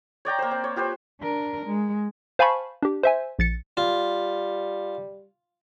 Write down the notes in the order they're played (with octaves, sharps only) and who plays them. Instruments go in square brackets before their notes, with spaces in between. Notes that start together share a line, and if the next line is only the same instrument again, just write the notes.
[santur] C#5 D5 G5 A#5
A#3 C5
C4
C#5
F4 G4 B4 C5
[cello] D4 A#4
G#3
[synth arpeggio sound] C5 F5 G#5 A5 B5 C#6
D4 G4
C5 E5 G#5
A#1 A6 C#7
[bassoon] G3 [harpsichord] F4